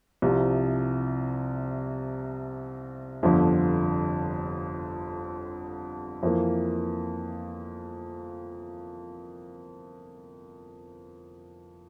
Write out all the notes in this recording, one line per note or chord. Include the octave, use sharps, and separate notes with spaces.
C2 C3 F3
G1 F2 D3 F3
F2 E3 A#3